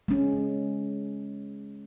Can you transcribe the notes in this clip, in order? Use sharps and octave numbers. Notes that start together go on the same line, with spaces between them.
G#3 C#4